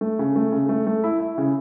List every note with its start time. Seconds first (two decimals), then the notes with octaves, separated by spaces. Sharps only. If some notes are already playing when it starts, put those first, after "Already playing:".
0.01 A3
0.19 C#3
0.36 A3
0.52 C#3
0.69 A3
0.87 A3
1.04 E4
1.20 E4
1.38 C#3